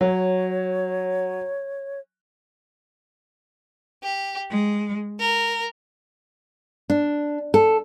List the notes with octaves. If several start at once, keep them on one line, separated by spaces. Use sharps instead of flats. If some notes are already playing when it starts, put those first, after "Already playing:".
F#3 C#5
G4
G#3
A#4
D4
A4